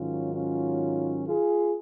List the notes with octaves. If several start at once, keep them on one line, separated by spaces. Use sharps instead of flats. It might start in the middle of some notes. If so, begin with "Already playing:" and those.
Already playing: G#2 D#3 F#3 C#4 F4
C#4 F4
F4 G#4